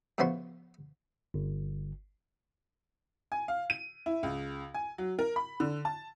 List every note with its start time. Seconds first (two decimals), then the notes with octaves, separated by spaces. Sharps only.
0.18 A2 C#3 F3 B3 F#4 C6
1.34 G1
3.32 G#5
3.48 F5
3.70 D#7
4.06 E4
4.23 C#2
4.74 G#5
4.98 F#3
5.19 A#4
5.36 B5
5.60 D3
5.85 A5